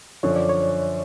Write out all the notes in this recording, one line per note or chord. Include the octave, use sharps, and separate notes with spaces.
F#2 D3 F3 C#5
D5
C#5